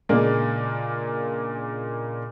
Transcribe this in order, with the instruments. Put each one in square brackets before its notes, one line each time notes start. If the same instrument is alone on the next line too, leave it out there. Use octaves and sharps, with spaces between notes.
[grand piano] A#2 C#3 G#3 A#3 D4